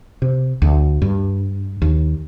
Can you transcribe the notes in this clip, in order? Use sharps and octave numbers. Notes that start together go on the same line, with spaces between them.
C3
D2
G2
D#2